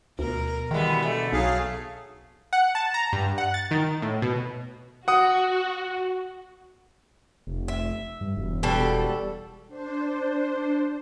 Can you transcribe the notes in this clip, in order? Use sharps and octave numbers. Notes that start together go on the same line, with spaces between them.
D2 B2 A#4
B2 D#3 E3 G3 G#3 B3
D3 A3
B1 F#3 G#4 F5
F#5
A5
A#5
G2
F#5
A6
D#3
A2
B2
F#4 F#5 D#6
F1
E5
G2
E1
B2 G3 A4
D4 C5